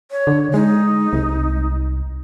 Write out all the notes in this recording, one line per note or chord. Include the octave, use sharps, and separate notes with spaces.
C#5
D3
G#3 D#4
C2